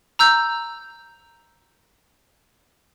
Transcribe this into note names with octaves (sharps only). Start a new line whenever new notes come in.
A#5 E6 G6